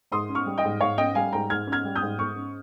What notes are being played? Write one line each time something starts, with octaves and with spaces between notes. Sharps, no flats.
G#2 C6 D#6
C#4
C#6 F6
G3
D#5 G5
G#2
G#2 C#5 F5
C#4 D#5 G5
G3 F5 G#5
G#2 G5 A#5
G#2 F6 G#6
C#4
F6 G#6
G3
D#6 G6
G#2
G#2 C#6 F6
C#4